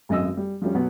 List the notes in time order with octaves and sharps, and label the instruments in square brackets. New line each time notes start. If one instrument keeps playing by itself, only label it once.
[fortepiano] G#1 F#2 D#5 E6
G3
F3 G3 C#4
B2 F#3 B3